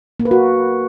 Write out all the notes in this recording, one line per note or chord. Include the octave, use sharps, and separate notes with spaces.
A#3
B4
F#4